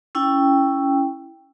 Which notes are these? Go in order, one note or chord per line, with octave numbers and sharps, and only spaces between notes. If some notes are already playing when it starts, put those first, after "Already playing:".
C#4 E4 G5